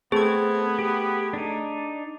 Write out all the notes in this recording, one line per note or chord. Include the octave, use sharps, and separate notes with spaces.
A3 B3 C4 G#4 G#6
G4
D4 D#4